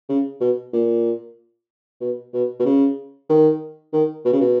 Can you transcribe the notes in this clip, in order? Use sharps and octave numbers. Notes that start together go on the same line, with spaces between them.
C#3
B2
A#2
B2
B2
B2
C#3
D#3
D#3
B2
C#3
B2